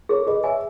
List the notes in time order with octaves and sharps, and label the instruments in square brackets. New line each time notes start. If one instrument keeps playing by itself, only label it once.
[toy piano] G#4 [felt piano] A#4 C#5
[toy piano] G#4 [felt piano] B4 D#5
[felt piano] C#5 E5 [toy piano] G#5